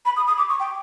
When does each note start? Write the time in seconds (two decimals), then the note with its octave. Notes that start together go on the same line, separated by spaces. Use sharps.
0.05 B5
0.17 D#6
0.28 D#6
0.38 D6
0.49 C#6
0.60 G5